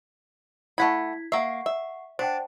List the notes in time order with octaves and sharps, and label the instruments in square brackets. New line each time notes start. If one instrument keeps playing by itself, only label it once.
[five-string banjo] A3 F#5 B5 [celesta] E4 G#6 B6
[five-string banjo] A#3 E5 [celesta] F#5 C#6 C7
[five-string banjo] E5
[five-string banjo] D4 [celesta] C5 F#5 G5